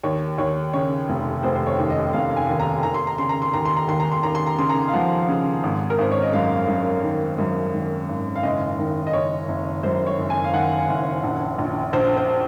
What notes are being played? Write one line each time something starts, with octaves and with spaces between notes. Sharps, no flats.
D#2 C#5
D#2 C#5
C#3 C#5
F1
F1 C5
C5
C#5
D#2
D#5
F1 F5
G#5
D#2
A#5
D#2 A#5
C6
A#5
C#3 C6
A#5
C6
D#2 A#5
C6
A#5
D#2 C6
A#5
C6
D#2 A#5
C6
A#5
C#3 C6
A#5
F5
F3 F#5
C#3
G#1
A#4
G#1 C5
C#5
D#5
F#2 F5
F#2
D#3
F#2
D#3
G#1
F5
F#1 D#5
D#3
D#5
F#1 C#5
F#1
F#2 C5
C#5
F#1
G#5
F5
D#3 F#5
F#1
A#1
A#1
A#1 C5
C5